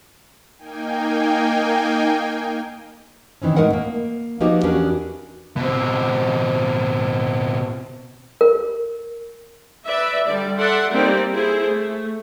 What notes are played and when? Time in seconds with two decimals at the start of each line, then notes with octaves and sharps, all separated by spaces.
0.57 A#3 D#4 G5 G#5
3.42 D#3 E3 C4 C#4
3.56 A2 G#3 A3 D#4 A#4 F#5
3.73 A#3
4.40 F3 A#3 B3 D#4 F#4 G4
4.63 E2 C#4 D4 F#4 A#4
5.57 B2 C4
8.41 A#4
9.85 B4 D5 E5
10.26 D3 G3 D5
10.58 A4 D5 E5 F#5 C6
10.91 G3 A#3 C4 D#4 D5
11.33 E4 G#4 A4 C5
11.67 A3